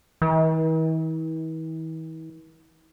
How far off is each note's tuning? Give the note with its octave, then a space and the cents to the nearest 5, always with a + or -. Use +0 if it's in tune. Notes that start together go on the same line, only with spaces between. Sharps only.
E3 -45